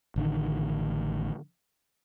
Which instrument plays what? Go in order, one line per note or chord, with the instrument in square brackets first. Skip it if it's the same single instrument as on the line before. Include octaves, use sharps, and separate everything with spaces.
[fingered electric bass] A1 D3 D#3